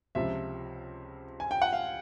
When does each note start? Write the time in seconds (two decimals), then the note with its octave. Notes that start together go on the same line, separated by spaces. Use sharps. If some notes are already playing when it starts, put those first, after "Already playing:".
0.15 C#2 C3 F3 E5
1.40 G#5
1.51 G5
1.62 F#5
1.73 F5